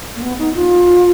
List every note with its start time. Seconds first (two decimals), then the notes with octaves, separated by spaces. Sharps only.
0.16 A#3
0.22 B3
0.39 D#4
0.54 F4